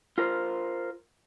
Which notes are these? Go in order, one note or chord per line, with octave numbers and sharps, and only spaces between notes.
F4 A#4 C5